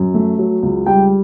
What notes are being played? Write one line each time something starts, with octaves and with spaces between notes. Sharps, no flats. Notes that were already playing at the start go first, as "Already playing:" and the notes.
Already playing: F#2
A3
F#3
C#2
G3 G5